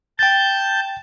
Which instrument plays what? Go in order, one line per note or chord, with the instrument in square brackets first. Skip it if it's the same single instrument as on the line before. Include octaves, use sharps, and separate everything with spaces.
[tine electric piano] G5 A6 [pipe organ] A5 G6